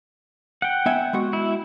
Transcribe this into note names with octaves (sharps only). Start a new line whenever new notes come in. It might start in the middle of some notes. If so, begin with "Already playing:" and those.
F#5 G5
B3 E5 G#5
G#3 B3 F#4
E4